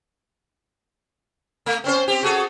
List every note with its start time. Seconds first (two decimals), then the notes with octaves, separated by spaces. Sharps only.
1.66 A3
1.84 C4 C#4 C5
2.08 C4 G4
2.23 F#4 G#4 A4